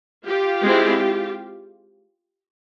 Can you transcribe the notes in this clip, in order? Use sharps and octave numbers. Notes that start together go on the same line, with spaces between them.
F4 G4
G#3 C4 E4